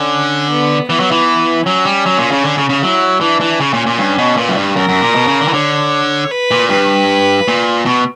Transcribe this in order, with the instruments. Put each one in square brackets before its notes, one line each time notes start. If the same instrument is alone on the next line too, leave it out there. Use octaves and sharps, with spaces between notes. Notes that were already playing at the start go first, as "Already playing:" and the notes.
Already playing: [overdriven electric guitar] D3 [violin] C#4
[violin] B3
[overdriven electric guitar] E3 [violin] B3
[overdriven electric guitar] F#3
E3
[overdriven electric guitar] F#3 [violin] C#4
[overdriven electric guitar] G3
F#3
A#2
C#3
D3
C#3
C#3
[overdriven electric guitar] F#3 [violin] E4
[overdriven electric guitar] E3 [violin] D4
[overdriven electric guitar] E3
[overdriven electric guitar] C#3 [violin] C#4
[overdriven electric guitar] A#2
A#2
[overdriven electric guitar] G2 [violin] C#4
[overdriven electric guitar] B2
[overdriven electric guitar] A#2 [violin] B4
[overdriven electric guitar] F#2
G2
[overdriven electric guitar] F#2 [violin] A#4
[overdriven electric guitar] F#2
A#2
B2
C#3
D3
E3
[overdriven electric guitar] D3 [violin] C#5
[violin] B4
[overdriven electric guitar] A#2
[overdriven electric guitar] G2 [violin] B4
[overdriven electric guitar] A#2
B2